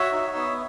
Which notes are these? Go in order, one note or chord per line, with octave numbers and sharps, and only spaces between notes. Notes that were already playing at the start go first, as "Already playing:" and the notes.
Already playing: F#4 C#5 E5
D#4
B3